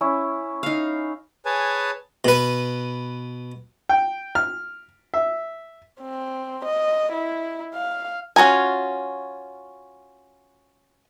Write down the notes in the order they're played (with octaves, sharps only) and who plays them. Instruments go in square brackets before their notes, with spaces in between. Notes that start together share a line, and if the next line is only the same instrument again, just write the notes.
[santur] C#4 E4
[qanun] D#4 F5
[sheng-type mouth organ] G#4 B4 C#5 G#5 A5
[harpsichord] B2 B4
[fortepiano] G5
F6
E5
[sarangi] C4
D#5
E4
F5
[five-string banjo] C#4 F4 F#4 A#4 G#5